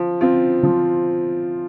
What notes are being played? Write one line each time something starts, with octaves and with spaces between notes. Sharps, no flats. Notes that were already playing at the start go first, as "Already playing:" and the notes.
Already playing: F3
C4 F4
F3